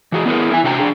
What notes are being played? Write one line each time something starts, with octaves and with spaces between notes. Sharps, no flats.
E3 F#4 G#4
B3 E4 G#4 A#4
E4 G#5
C3 D4 F#4 G5 A5 A#5
D4 G#4